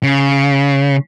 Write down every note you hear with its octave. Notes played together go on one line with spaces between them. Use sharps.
C#3